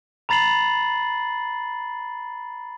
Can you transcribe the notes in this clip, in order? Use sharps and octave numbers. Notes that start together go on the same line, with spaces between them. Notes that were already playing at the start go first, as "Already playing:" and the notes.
A#5 B5 A6 C7 F#7